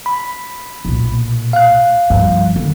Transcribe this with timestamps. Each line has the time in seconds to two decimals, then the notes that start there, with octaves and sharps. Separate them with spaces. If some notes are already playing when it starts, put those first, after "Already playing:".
0.06 B5
0.85 B1 A#2
1.53 F5 F#6
2.10 G2 F3
2.56 D3 D#3